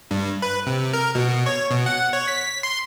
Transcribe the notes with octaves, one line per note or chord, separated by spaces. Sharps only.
G2
B4
C3
A#4
B2
C#5
B2
F#5
C#5
B6
C6